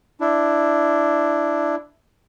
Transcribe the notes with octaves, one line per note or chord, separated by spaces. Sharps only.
D4 E4